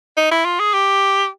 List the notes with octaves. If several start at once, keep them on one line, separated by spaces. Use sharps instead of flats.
D#4
E4
F4
G#4
G4